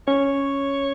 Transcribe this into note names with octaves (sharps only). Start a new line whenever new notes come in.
C#4 C#5